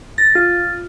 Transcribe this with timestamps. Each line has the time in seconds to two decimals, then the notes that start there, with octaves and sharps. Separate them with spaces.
0.18 A6 A#6
0.35 F4